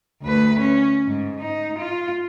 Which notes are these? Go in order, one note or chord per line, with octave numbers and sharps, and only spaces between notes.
D2 B4
C#4
G#2
D#4
F4